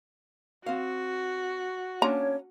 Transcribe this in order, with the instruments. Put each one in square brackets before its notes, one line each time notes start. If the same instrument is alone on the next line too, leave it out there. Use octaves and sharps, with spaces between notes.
[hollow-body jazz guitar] C4 F5 [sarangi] F#4
[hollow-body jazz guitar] A#3 C#4 D4 [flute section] C#5 [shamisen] A#5